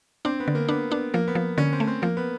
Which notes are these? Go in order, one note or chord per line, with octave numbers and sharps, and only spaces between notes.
C4 D4
B3
D3
A#3
B3 D4
B3 D4
F3 A#3
B3
F3
D3 C#4
C4
A3
C4
F3 A#3
B3